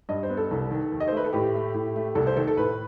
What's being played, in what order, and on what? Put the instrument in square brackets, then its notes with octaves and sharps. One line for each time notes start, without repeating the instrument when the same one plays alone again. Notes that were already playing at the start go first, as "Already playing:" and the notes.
[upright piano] G2 D#5
C5
B3
A4
C2
D#3
D#2
D#5
C5
A3 B4
A4
A2 G4
A3
A2
A3
C2 A4
C5
D#3 A4
A4
A2 B4